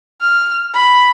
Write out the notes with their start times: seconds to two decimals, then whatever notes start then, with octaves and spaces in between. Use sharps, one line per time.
0.22 F6
0.74 B5